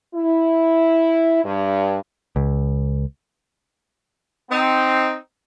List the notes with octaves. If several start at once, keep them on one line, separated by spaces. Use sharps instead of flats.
E4
G2
C#2
C4 D#4